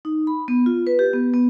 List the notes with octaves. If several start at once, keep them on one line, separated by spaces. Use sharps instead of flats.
D#4
B5
B3
F4
B4
G4
B3
B3